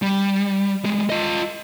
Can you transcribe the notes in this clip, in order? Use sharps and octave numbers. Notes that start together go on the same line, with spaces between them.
G3
G3 G#3
F4 D#5